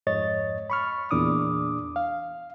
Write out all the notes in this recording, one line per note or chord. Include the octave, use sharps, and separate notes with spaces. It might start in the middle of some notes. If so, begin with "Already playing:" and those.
F2 G#2 C#5 D#5 A6
B5 C#6 F6
E2 A#2 D4 D6 D#6
F5